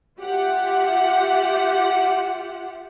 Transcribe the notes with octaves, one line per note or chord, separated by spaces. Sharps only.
F4 G4 E5 F#5